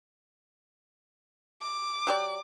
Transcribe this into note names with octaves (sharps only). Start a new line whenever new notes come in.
D6
F#3 G4 D5